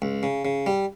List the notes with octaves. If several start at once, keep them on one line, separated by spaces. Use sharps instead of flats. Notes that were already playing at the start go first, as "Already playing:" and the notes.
C#2
C#3
C#3
G3